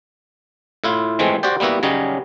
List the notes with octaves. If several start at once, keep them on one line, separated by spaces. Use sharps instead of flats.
A2 E4 F4
E3 F3 G#3 A3 C4
F#4 G4 C5 D5 G5
G3 A#3 B3 E4 F#4
C#3 F#3 G3 C#4 D#4